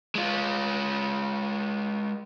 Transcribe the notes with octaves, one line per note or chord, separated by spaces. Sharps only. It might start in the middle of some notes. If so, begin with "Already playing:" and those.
G#3 F4